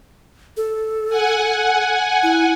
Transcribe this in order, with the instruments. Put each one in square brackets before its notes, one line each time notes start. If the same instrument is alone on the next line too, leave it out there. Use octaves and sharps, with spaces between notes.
[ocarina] A4
[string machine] F#5 G#5
[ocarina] E4